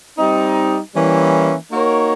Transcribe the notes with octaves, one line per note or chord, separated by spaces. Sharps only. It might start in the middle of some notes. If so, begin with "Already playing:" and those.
G3 C4 D#4
E3 G3 A#3 C#4 E4
A#3 D#4 F#4 A#4 C#5